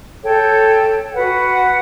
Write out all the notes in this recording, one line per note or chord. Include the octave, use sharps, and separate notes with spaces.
A4 C#5 G5
F#4 B4 F#5